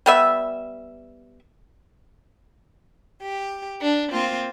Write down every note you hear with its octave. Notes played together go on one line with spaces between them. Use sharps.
G3 B3 E5
G4
D4
A#3 C4 F4